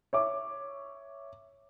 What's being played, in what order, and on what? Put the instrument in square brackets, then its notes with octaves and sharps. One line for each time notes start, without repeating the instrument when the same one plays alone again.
[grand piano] C#5 E5 D6